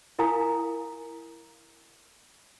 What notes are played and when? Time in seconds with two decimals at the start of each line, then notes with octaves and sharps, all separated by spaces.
0.19 E4 A#4 F5 G#5 A#5 D#6